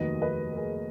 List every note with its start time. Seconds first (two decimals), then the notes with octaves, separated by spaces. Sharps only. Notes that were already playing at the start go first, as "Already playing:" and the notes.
Already playing: F1 D#2 D#3 F#3 B4 D#5
0.22 B4 D#5
0.52 A#4
0.56 G#4 B4